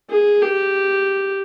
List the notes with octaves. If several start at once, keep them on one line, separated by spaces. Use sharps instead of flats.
G#4
G4